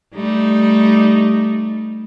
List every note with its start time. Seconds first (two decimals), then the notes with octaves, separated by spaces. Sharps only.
0.14 G3 A3 D#4